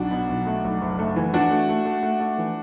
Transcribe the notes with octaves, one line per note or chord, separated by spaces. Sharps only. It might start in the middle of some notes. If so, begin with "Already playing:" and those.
Already playing: B1 D4 F#4
B2
B1
A3
B1
F#1
A3
E3
E3 D4 F#4
A3
A3
A3
A3
A3
E3